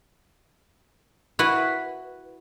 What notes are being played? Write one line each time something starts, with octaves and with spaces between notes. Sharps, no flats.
E4 F#4 B4